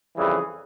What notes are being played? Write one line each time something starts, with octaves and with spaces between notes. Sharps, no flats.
F2 C#3 E3 G3 G#4